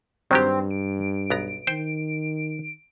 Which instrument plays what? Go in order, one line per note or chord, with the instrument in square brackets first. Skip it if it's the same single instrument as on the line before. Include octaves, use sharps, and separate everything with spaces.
[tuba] G2 [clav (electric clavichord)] D#3 F#3 G4 [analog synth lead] C4
[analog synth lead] D7
[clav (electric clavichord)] B1 B3 A#5
[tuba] D#3 [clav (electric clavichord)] C5 G5